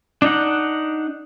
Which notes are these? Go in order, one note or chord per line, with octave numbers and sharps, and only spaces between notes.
D4 D#4 F#5